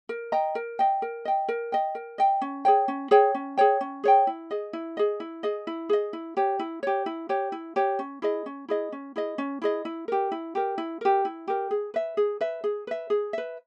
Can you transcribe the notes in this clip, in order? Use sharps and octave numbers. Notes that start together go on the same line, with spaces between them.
A#4
D#5 G5 A#5
A#4
D#5 G5
A#4
D#5 G5
A#4
D#5 G5
A#4
D#5 G5
C#4
G#4 C#5 G5
C#4
G#4 C#5 G5
C#4
G#4 C#5 G5
C#4
G#4 C#5 G5
E4
G#4 D#5
E4
G#4 D#5
E4
G#4 D#5
E4
G#4 D#5
E4
G4 C#5
E4
G4 C#5
E4
G4 C#5
E4
G4 C#5
C#4
E4 G#4 D#5
C#4
E4 G#4 D#5
C#4
E4 G#4 D#5
C#4
E4 G#4 D#5
E4
G4 A#4
E4
G4 A#4
E4
G4 A#4
E4
G4 A#4
G#4
B4 E5
G#4
B4 E5
G#4
B4 E5
G#4
B4 E5